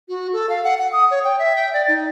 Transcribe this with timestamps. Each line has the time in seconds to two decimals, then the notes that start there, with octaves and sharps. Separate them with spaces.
0.09 F#4
0.33 A4
0.49 F5
0.64 F#5
0.78 F#5
0.93 D#6
1.11 C#5
1.24 G5
1.39 E5
1.56 G5
1.73 D5
1.88 D#4